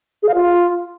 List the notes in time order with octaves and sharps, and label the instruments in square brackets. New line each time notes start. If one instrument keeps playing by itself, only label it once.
[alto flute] G#4
F5
F4